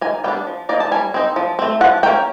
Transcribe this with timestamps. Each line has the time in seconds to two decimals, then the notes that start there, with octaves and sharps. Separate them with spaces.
0.01 D#3 G#5
0.24 G3 B3 D4 G5
0.47 F3
0.69 A#3 D#4 D5
0.80 A5
0.91 G3 G#5
1.14 C4 D#4
1.36 F3
1.59 A3 C4
1.81 F3 F#5
2.03 A#3 C#4 G5